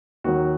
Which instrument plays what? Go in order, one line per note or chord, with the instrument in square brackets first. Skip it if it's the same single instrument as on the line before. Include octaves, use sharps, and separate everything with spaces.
[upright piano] D#2 D#3 F#3 F#4